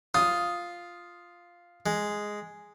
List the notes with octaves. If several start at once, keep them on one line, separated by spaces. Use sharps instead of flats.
F4 D#6
G#3